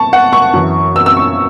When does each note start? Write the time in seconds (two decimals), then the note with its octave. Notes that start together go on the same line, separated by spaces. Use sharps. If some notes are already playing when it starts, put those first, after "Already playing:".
Already playing: A5 C#6
0.13 F#5
0.33 C#6
0.53 F#2 E3
0.96 E6
1.06 E6
1.17 C#6